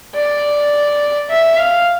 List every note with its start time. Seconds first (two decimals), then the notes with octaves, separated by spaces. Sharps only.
0.15 D5
1.29 E5
1.58 F5